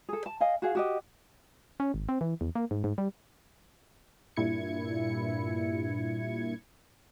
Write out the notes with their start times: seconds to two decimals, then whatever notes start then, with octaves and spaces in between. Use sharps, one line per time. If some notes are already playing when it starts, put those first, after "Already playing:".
0.09 G#4 A4
0.26 A5
0.40 D#5 F5 G#5
0.62 F#4 G#4 F5
0.75 F#4 G4 D#5
1.80 C#4
1.94 G#1
2.09 C4
2.21 E3
2.41 E2
2.55 A#3
2.71 G#2
2.84 G#2
2.98 G3
4.37 G2 A#2 E4 G#6 C#7